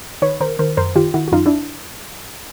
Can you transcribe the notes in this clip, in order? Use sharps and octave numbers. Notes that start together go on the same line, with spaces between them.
D#3 B4 C#5
D#3 A#4 C5
D#3 A#4 C5
F#2 A#4 C5
D#3 F4 G4
D#3 E4 F#4
F#4
F#2 D#4 F4
D4 E4